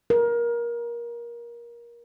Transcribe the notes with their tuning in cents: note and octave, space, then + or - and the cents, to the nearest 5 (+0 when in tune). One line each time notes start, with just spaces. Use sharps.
A#4 +20